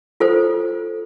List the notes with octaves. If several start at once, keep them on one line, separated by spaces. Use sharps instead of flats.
F4 A4 C5